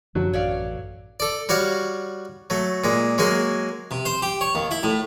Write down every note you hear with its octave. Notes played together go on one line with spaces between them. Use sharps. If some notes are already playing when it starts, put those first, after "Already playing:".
F#2 D3 F3 F#3 D4
A1 C#5 D5 F5
A4 D5
G3 F#4 C#5 F5
F#3 A3
A#2 G#3
F#3 G#3 A#3 G#4
C3
C5
G4
C#5
D#2
E4
A2